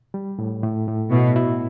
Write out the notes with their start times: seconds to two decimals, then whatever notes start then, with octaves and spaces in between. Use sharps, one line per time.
0.14 G3
0.39 A2
0.63 A2
0.87 A2
1.11 B2 E4
1.36 E4